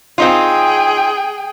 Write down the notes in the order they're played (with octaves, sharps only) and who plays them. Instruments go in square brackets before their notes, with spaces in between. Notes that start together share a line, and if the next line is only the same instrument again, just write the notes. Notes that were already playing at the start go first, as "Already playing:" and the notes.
[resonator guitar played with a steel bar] C4 D#4 F4 [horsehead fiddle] G#4 G5